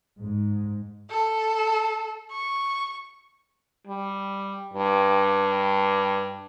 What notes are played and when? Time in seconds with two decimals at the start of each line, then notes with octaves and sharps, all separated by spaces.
0.22 G#2
1.10 A4
2.32 C#6
3.87 G3
4.74 G2